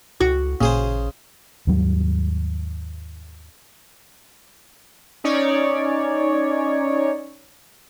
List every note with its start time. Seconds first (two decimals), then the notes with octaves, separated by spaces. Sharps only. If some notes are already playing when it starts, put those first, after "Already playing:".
0.21 C#2 F#4
0.61 A1 A#2 C#3 G#4 C5
1.67 D#2 G#2 F#3 G3
5.24 C#4 D#4 C#5 D5